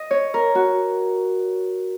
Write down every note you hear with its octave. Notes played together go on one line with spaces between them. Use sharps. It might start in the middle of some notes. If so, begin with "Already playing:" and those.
Already playing: D#5
C#5
A#4
F#4